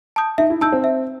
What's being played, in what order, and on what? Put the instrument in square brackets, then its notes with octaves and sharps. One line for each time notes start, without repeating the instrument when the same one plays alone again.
[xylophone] A5 D#6 G6
[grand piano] D#4 [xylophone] E5
[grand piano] E4
[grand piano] D#4 [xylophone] A5 E6 G6
[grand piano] C4
[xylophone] E5